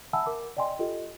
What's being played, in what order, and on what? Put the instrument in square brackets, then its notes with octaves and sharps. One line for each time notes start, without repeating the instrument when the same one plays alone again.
[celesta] E5 F#5 G#5 A5 B5 E6
A#4 D6
D5 D#5 G5 G#5 C6
F4 G4 A4 D#5